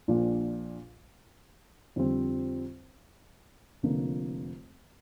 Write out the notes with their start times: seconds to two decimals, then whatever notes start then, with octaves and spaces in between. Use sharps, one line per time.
0.08 A#1 A#2 F3 D4
1.96 F2 D3 G3 C4
3.83 F1 F2 D3 A#3